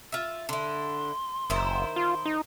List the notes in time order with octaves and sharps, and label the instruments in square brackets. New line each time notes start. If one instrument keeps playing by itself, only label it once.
[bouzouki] F4 E5
[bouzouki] D3 E4 [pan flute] C6
[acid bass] F#1 [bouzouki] D#3 E4 C5
[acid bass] F4 [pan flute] C6
[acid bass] D#4